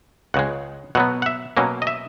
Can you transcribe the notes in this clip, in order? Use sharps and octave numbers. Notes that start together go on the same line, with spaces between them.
C#2 C#3 G#3 F#5
B2 F#3 B3 F#5
F#5
E5
B2 F#3 A#3 C#4
D#5
E5